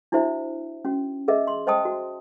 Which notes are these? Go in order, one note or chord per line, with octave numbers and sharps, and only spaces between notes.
D4 E4 F#4 C5 E5
C#4 F#4
G#4 A#4 D#5 E5
C6
C5 D#5 G5 A5 D#6
F#4